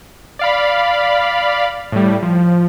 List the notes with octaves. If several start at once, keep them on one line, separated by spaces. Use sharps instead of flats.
D5 F5 B5
A2 G3
F3